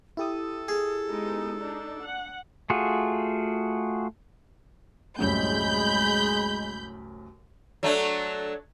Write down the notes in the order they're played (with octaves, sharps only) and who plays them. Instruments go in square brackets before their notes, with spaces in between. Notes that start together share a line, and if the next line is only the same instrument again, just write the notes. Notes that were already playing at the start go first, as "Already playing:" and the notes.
[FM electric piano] E4 G4 D#6 [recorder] A4
[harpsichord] G#4
[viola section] G#3 B3 D#4
D4 D#4
F#5
[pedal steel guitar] A3 F4 F#4 G#4
[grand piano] C2 F#2 A2 [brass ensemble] G#3 [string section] B5 G6
[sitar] F#3 A3 D4